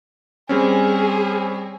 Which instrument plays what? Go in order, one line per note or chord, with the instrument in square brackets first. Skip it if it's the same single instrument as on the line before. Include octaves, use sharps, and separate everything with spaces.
[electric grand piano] G3 C4 C#4 [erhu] G#4